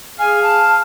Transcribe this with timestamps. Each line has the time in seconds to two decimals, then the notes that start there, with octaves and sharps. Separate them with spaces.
0.19 G#4 F5 G#5
0.43 A5